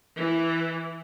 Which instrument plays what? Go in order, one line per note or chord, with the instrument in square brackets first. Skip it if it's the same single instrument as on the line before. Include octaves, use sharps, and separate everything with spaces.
[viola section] E3